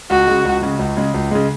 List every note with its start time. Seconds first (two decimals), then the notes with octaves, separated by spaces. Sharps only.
0.10 C#2 F#4
0.27 C#3 G#3
0.45 C#2
0.62 C#3 G#3
0.79 C#2
0.97 C#3 G#3
1.14 C#2
1.31 C#3 G#3